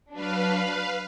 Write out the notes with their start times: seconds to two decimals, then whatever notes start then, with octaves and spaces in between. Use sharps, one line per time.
0.14 F#3 D4 B4 F5